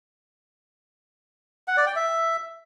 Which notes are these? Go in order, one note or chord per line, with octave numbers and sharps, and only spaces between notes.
F#5
D5
G5
E5